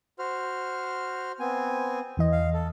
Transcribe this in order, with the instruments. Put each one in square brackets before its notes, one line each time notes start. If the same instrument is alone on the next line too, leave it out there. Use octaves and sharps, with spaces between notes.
[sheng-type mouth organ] F#4 C5 F6
B3 C4 G#5
[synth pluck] E2 E3 D#5
[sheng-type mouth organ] F5
A4